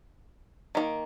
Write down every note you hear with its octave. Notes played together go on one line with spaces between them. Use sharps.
D#3 G3 A#3